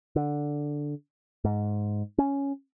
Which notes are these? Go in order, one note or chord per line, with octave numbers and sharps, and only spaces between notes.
D3
G#2
C#4